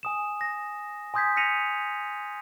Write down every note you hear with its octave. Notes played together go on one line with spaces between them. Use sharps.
G#5 D#6 E7
A#6
G#5 C6 D#6 G6 G#6 B6
F6 A#6 B6 C#7 D#7 F7